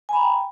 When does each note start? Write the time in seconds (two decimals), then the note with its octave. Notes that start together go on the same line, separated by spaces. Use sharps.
0.09 G#5
0.13 B5
0.17 A#5
0.21 G5